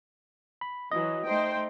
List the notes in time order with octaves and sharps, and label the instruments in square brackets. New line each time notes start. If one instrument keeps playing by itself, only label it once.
[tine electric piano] B5
[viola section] E3 F#3 [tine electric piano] D#5
[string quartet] A3 D#4 [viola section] C5 G5 C6